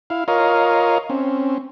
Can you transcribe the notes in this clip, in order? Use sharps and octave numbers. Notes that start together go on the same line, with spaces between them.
E4 F5
F4 A#4 C#5 D#5 F5
C4 C#4